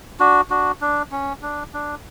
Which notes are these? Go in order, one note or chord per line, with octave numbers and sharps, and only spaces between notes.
D4 F#4
D4 F#4
D4
C#4
D4
D4